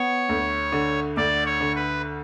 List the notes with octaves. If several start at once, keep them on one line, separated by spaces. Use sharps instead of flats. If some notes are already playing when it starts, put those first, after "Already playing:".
Already playing: B3 C#5
D2
D3
D2 D5
C#5
D3
B4